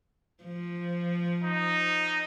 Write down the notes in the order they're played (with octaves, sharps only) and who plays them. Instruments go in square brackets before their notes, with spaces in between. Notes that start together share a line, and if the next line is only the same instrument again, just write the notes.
[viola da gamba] F3
[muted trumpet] D#4